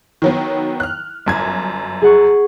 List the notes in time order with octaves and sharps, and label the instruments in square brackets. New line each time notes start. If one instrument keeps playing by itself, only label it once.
[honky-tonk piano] D#3 F#3 B3
F6 F#6
G1 F#2 G#6
[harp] G#4 F#5 C#6